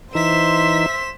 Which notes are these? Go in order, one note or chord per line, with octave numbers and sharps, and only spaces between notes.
E3 D#4 C5 E5 C6 B6 E7